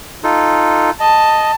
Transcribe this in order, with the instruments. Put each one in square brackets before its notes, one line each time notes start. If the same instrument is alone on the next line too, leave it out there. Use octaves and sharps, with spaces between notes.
[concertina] D#4 F4 A4
[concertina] D#5 [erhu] A5